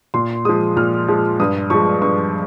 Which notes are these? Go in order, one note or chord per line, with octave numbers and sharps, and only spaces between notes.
A#2 C6
F3 G#3 D#6
A#2 F6
F3 G#3
G2 D#6
F3 G#3 C#6
G2 C#6